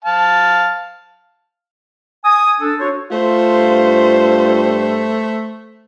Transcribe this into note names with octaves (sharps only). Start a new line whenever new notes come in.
F5 A5
G#5 D#6
D4 A4
D4 F#4 A4 C5 C#5
A3 F4 C5
G2